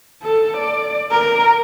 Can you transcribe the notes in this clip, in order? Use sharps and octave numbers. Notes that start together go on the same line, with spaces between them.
A4
D5
A#4